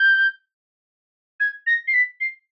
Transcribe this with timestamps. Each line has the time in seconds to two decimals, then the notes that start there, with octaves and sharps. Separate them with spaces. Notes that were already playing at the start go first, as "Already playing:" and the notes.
Already playing: G6
1.40 G#6
1.67 A#6
1.88 C7
1.94 B6
2.21 C7